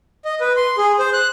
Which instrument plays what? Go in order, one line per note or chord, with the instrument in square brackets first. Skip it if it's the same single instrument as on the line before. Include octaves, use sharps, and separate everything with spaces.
[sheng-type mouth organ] D#5
B4
C6
G#4
C5
F#6